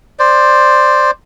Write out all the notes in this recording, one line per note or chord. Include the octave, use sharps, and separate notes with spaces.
C5 D5